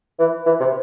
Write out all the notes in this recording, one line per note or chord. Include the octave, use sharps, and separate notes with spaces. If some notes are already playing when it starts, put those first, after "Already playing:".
E3
E3
C3